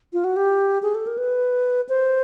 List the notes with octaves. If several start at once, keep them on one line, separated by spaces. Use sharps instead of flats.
F4
F#4
G4
G#4
A4
A#4
B4
C5